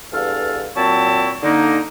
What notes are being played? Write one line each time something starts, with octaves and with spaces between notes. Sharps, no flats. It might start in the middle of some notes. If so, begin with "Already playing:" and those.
E2 G2 A4 F5
A#2 F#3 C4 E4 A5 C#6
D3 A#3 D#4